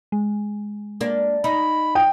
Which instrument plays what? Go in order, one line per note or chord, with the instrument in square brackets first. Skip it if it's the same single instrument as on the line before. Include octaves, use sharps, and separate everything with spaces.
[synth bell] G#3
[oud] A#3 D4
[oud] D#4 [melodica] B5
[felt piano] G5 [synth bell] D#6